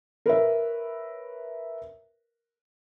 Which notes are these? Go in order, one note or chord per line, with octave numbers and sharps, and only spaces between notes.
A#4 B4 C#5 E5